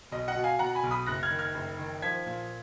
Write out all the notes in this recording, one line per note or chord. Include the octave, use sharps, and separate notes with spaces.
B1 D#5
D#5 F#5
B2
F5 G#5
B2 F#5 A#5
G#5 B5
B1
B5 D#6
F#1 F#6 A#6
F6 G#6
D#3
F6 G#6
F#1
D#3
F3 G#6 B6
A#2